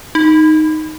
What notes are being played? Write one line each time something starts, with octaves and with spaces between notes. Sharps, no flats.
D#4